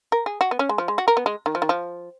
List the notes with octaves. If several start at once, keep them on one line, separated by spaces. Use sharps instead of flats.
A#4
G#4
F#4
B3
C#4
G#3
F3
G#3
F#4
A#4
B3
G#3
D#3
F3
D#3
F3